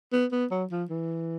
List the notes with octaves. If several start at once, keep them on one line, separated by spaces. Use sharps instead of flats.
B3
B3
F#3
F3
E3